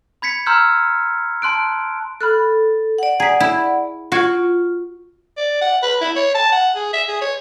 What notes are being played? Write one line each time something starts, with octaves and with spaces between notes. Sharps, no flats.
B5 G#6 B6 C#7
A#5 C6 E6 F6 G6 G#6
A5 C6 F#6 D7
A4 B5 F6 F#6
D5 F#5
G#4 A#5 B6
E4
F4 F#4 C#6 G#6 D7
D5
F#5
B4
E4
C#5
A5
F#5
G#4
E5
G#4
C#5